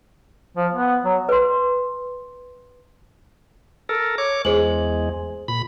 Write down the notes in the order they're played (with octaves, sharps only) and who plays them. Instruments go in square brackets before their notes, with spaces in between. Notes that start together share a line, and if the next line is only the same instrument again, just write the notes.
[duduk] F3
B3
F#3
[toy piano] B4 C6
[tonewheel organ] A4 A#4
C#5 D6
[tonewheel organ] E2 G#3 [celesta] G#4 C5 F#7
[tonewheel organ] A#2 B5